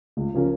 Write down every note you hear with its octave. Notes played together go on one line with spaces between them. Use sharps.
C#2
C#3 F3 C#4 A#4